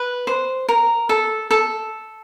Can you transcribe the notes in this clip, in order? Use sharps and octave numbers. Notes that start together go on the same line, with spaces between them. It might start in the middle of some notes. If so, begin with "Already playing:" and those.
Already playing: B4
C5
A#4
A4
A4